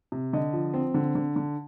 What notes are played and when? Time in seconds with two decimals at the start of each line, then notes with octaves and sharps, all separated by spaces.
0.12 C3
0.33 D3 D#5
0.53 F3
0.74 C4
0.94 D3
1.15 D3
1.36 D3